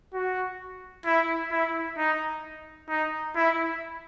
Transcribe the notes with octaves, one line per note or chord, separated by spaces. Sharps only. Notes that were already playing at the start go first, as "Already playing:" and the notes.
F#4
E4
E4
D#4
D#4
E4